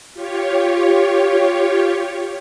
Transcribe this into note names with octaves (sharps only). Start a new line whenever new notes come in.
F4 G4 C#5